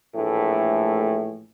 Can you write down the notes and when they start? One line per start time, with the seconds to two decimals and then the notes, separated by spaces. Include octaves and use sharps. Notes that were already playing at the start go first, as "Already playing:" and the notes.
0.15 A#1 A2 E3 A3